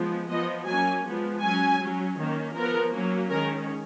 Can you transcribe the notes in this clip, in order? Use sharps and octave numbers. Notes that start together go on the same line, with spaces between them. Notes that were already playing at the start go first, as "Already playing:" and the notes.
Already playing: F3 G#3 B3
F3 B3 D#5
F#3 A#3 C#4 G#5
F3 G#3 B3
F#3 C#4 G#5
F#3 C#4
D#3 A#3 C#4
F3 B3 A#4
F#3 A#3 C#4
D#3 G#3 C#4 A#4